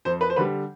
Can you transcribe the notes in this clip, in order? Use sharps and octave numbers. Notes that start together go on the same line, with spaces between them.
F2 C5
B4
C5
D3 G3 B4